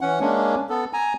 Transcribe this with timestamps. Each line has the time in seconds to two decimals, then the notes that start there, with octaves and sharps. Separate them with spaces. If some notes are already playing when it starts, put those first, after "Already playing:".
0.01 E3 C#4 F#5
0.20 G#3 A#3 C#4 D4
0.70 B3 A4
0.93 G#5 A#5